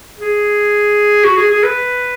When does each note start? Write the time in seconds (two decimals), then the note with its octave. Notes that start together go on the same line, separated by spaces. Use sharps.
0.19 G#4
1.24 F#4
1.37 G#4
1.50 G#4
1.64 B4